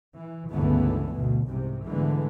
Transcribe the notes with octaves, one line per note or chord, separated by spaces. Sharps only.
E3
G1 C#2 D3 E3 A3 B3
D2 B2
C2 G#2 C3
G#2 D3 E3 G#3 A3 B3